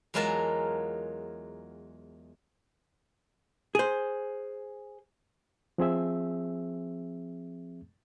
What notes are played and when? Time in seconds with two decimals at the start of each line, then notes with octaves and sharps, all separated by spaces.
0.14 E2 F#3 G#3 F4 A#4 A5
3.75 G#4 C5
5.78 F3 C4 G#4 E5